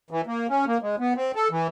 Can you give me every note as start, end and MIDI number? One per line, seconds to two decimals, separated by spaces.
0.11 0.21 52
0.27 0.47 58
0.49 0.65 61
0.67 0.78 58
0.82 0.96 56
0.99 1.13 59
1.16 1.32 60
1.35 1.48 69
1.51 1.67 52